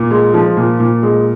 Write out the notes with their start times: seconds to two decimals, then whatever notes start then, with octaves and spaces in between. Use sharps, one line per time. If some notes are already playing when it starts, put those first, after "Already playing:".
Already playing: A#2
0.11 G#3
0.34 F3
0.57 A#2
0.80 A#2
1.03 G#3